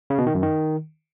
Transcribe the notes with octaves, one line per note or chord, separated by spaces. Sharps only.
C#3
B2
D#3
F#2
D#3